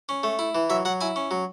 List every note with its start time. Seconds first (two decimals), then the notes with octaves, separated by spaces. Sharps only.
0.09 C#4
0.23 A3
0.39 E4
0.55 E3
0.70 F#3 E5
0.85 F#3 F#5
1.01 E4 G#5
1.16 C#4
1.31 F#3